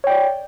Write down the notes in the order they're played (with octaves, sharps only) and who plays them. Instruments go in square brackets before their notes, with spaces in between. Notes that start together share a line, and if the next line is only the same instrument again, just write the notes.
[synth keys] C#5
G5
D5